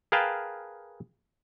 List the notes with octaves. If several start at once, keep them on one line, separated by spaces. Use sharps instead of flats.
G#4 A#4 B4 F5 G5 A5